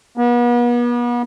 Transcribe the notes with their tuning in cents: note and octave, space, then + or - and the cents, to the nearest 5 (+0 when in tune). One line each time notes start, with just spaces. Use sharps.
B3 -40